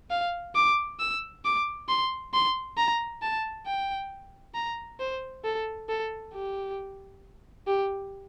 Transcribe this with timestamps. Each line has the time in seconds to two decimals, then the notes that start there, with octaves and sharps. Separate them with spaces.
0.11 F5
0.55 D6
1.00 E6
1.45 D6
1.89 C6
2.34 C6
2.77 A#5
3.22 A5
3.67 G5
4.55 A#5
5.00 C5
5.45 A4
5.89 A4
6.33 G4
7.67 G4